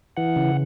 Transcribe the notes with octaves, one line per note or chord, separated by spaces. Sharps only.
E3 F#5
C#3